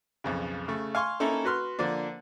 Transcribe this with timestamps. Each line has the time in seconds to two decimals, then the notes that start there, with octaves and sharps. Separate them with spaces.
0.24 B1 F2 C#3
0.68 C#3 A3
0.95 F5 G#5 C6 C#6
1.20 A#3 C#4 D#4 E4 A4
1.44 F#4 B4 C6 F6
1.79 D3 F3 A#3 D4